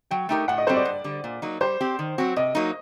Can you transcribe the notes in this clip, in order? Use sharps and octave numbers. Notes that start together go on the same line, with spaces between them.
F#3 G5
A3 D#4 G4 A#4 G5
A2 F#5
D#5
G3 C4 F#4 A4 C5
D5
G2
D3 G3
A#2
F#3 A#3 D#4
G3 C5
C4 G4
D#3
F#3 C4 F#4
C3 D#5
F#3 A#3 D#4